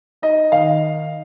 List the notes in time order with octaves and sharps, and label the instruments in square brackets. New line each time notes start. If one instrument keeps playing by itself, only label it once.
[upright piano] D#4 D#5
D#3 F5